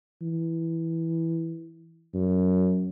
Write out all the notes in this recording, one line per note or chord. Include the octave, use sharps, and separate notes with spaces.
E3
F#2